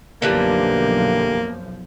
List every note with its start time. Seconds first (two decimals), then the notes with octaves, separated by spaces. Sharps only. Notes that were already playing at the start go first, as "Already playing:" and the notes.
0.22 B1 F#2 D3 E3 F3 G3 A#3